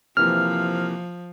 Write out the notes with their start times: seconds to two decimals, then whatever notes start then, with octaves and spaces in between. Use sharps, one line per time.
0.17 C3 E3 F3 A#3 F6